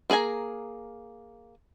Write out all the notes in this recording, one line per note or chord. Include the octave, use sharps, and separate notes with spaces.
A#3 G#4 B4 G#5 A#5